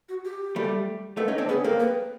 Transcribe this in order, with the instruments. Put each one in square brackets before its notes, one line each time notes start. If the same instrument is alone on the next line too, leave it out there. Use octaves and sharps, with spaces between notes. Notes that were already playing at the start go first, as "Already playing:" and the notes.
[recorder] F#4
G4
[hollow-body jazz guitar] G3 A3
A3 B3
C#4 D#4
C4 D4
[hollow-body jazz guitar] B3 C#4 [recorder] G#4
[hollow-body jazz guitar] A#3 C4 [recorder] A4
[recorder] B4